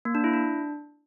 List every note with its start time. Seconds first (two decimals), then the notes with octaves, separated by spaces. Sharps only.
0.05 A#3
0.15 D4
0.24 E4
0.33 D4